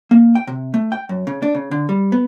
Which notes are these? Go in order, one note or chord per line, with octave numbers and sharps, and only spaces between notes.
A#3
G5
C3
A3
G5
F#2
C#3
D4
C#3
D3
G3
B3